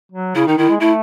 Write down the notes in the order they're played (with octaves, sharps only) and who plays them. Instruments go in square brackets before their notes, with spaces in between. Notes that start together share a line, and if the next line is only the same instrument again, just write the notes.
[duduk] F#3
[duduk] C#3 [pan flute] E4
[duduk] D#3 [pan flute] D#4
[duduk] D#3 [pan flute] E4
[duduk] G#3
[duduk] A3 [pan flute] E4